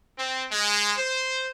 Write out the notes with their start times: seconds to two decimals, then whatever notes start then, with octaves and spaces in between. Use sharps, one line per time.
0.18 C4
0.52 G#3
0.97 C5